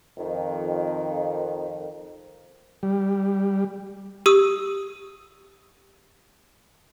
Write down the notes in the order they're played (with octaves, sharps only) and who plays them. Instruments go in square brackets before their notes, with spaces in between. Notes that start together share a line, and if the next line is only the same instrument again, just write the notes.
[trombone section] F2 D#3
[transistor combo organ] G3
[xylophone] G4 D#6 E6